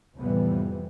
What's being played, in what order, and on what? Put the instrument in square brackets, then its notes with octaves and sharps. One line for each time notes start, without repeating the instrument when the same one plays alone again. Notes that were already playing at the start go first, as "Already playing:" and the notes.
[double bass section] F1 F2 A2 E3 G3 B3